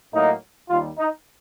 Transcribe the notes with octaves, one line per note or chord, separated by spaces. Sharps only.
A2 F#3 A#3 D#4
D#2 D#3 G3 F4
D#4